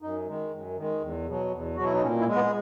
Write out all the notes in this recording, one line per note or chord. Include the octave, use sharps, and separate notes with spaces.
F#2 D#4
D#3 G#3
F#2
D#3 G#3
E2
B2 F#3
E2
B2 F#3 F#4
E4
D#4
A#2 C#4
E4
G#3
B3